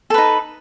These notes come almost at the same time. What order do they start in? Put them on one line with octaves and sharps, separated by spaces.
A4 B4 D#4